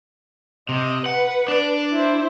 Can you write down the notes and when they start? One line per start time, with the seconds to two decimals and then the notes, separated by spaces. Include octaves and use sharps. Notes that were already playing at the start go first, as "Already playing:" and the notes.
0.69 C3 D#5
1.06 B4 F#5
1.48 D4 D5
1.92 E4 C5